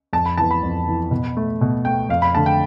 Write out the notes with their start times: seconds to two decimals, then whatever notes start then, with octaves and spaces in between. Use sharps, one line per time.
0.13 F2 A5
0.26 B5
0.38 E3 B3 A5
0.51 B5
0.63 F2
0.87 E3 B3
1.11 B2
1.37 A3
1.61 B2
1.85 A3 G5
2.09 F2 F5
2.22 B5
2.35 D3 A3 A5
2.46 G5